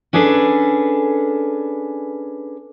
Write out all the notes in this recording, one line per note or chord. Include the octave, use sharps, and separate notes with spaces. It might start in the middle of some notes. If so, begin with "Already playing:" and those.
C#4 D4 G#4 A4 B4